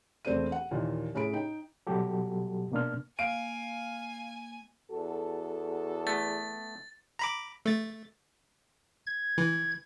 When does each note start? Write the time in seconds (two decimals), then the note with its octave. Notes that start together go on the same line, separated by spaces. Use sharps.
0.25 E1 A3 C4 C5 D5 D#7
0.52 F#5
0.71 D#2 A#2 D#3 E3
1.15 A2 C#4 G#4 B5 D7
1.33 D#4 G5
1.87 B2 F#3 G3 F#4 G4 A4
2.72 B2 A#3 D4 F6
3.19 A#3 F5 G#5 D7
4.91 E2 F#4 A4
6.07 A3 B3 A6
7.19 A#5 B5 D6
7.66 A3 A6
9.07 G#6
9.38 E3